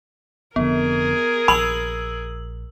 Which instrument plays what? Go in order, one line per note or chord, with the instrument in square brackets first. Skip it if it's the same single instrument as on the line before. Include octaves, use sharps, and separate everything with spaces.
[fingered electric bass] F1 F2 D3 [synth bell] B3 [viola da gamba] G#4 A#4
[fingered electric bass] A#1 [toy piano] B5 [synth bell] E6 F#7